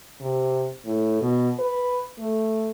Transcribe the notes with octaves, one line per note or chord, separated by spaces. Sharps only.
C3
A2
B2
B4
A3